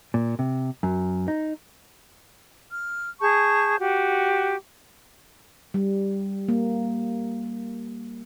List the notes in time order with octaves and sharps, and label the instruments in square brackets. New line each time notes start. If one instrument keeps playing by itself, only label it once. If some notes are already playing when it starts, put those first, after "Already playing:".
[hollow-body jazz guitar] A#2
C3
F#2
D#4
[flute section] F6
G#4 A5 C#6 G6
F#4 G4
[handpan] G3
A#3